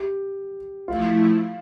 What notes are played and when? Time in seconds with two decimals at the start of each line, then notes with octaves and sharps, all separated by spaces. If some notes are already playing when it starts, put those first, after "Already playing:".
Already playing: G4
0.88 F3 A3 E4 F4